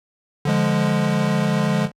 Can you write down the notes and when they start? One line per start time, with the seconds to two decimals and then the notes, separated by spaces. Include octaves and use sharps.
0.45 D3 F3 G#3